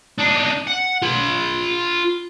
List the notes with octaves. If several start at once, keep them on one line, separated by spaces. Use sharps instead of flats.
D4 D#4
F#5
F4 B5